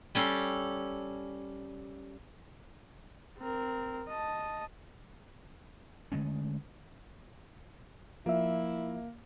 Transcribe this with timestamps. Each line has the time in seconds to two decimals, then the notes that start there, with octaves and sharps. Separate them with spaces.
0.15 G3 C#4 A4 C6
3.38 C4 A#4
4.09 D#5 A5
6.12 D3 G#3 A3 C#4
8.26 F3 A#3 E4 E5